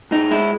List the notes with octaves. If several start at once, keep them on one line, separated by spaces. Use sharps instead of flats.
A2 D#4
G#3 E4